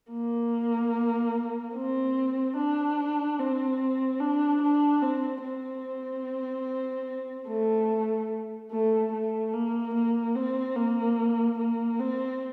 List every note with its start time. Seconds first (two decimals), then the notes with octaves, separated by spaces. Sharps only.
0.11 A#3
1.75 C4
2.57 D4
3.39 C4
4.20 D4
4.62 D4
5.03 C4
5.44 C4
7.48 A3
8.71 A3
9.12 A3
9.53 A#3
9.94 A#3
10.36 C4
10.76 A#3
11.58 A#3
12.00 C4